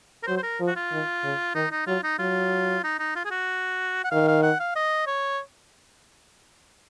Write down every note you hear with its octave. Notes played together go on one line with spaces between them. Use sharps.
A#4
F#3 C5
C5
A#4
F3
F#4
F4
D#3
C#3
D#3 D#4
D#4
F#3 F4
D#4
F#3 F4
D#4
D#4
F4
G#4
F#4
F#5
D#3 F5
F5
F#5
F5
D#5
C#5